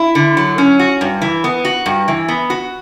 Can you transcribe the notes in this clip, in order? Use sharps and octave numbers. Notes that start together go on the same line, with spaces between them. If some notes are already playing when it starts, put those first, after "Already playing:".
Already playing: E4
D3
F#3
C#4
F#4
G2
E3
B3
F#4
G2
E3
B3
F#4